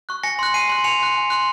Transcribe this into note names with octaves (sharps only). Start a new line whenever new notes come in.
C#6 F#6
G#5 A#6 C#7
C6 F#6
G#5 C7 D#7
C6 F#6
G#5 C#7 F7
C6 F#6
G#5
C6 F#6